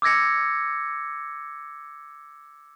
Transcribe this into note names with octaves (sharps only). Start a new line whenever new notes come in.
D6 E6 G#6 A#6 C#7